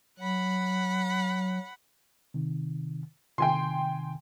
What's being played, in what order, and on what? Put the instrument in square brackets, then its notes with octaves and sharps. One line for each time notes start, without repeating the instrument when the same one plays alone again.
[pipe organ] F#3 [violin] F#5 B5
[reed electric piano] C3 D#3
[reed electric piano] C3 D#3 [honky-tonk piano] G5 G#5 C6